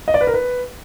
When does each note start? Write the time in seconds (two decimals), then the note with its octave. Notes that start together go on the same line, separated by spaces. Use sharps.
0.08 D#5
0.14 D5
0.21 B4
0.27 A#4
0.34 B4